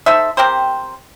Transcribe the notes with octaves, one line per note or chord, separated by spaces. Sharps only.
D#4 A4 C5 E5
C4 G4 A#4 C5